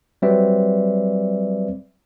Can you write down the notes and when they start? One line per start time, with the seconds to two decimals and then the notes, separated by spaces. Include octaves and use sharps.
0.22 F#3 G3 C4 B4 D5 E5